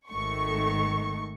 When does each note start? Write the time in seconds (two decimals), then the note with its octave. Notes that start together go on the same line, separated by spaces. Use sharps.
0.11 G#1 G#2 D#3 A3 C#6